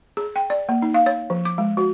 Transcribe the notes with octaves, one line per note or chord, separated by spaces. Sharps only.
G#4
G5
D5
A#3
D#4
F5
C#5
F3
D6
G#3
F#4